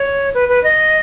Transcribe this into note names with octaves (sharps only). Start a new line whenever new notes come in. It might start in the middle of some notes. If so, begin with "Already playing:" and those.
Already playing: C#5
B4
B4
D#5